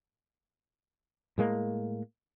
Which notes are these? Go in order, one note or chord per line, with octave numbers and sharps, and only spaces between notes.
A2 G#3 A#3